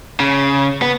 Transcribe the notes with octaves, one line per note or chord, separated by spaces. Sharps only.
C#3
B3